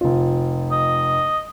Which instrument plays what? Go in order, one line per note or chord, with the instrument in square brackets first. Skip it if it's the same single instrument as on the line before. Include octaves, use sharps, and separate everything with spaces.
[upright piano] F1 F4
[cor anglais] D#5